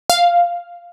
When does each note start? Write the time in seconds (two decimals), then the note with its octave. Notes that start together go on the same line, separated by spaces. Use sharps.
0.10 F5